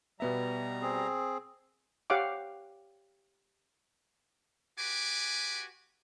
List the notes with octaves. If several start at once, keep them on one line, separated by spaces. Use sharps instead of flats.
B2 G3 B3 E5 A#5
C4 G#4
G4 C#5 F5 F#5 D6
F#4 G4 B4 G#5 D6